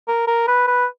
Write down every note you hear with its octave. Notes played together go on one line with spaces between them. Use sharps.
A#4
A#4
B4
B4